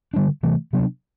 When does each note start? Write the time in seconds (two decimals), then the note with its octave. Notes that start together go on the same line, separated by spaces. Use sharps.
0.14 D3 G3 D4
0.43 C3 E3 A3
0.73 C3 F#3 B3 D4